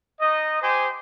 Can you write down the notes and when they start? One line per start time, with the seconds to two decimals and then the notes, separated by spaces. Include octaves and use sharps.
0.20 D#4 D#5
0.62 G4 C5 G#5